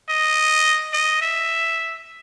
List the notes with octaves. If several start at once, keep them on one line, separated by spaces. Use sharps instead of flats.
D#5
D#5
E5